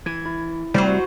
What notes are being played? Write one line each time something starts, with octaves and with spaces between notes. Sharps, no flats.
E3 G#6
E4
C3 F#3 G3 A3 C4 F#4 C5